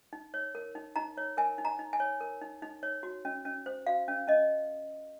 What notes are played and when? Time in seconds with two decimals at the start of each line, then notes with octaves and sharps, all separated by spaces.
0.13 D#4
0.34 C#5
0.55 A#4
0.75 D#4
0.96 D#4 A#5
1.18 C#5
1.37 A#4 G#5
1.58 D#4
1.65 A#5
1.79 D#4
1.93 G#5
2.00 C#5
2.21 A#4
2.41 D#4
2.62 D#4
2.83 C#5
3.03 F#4
3.25 C#4
3.45 C#4
3.66 C5
3.87 F#4 F5
4.08 C#4
4.27 C#4 D#5